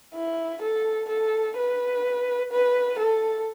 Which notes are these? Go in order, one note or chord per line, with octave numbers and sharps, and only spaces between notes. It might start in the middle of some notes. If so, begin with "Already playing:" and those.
E4
A4
A4
B4
B4
A4